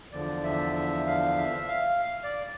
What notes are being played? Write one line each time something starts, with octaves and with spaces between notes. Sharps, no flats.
E2 D3 F3 D5
E5
E5
F5
E5
F5
D5